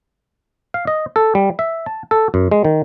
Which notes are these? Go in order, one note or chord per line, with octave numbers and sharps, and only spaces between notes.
F5
D#5
A4
G3
E5
A5
A4
F#2
G#3
D#3